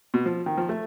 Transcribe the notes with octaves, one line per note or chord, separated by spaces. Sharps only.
B2
F3
D#3
F3
A3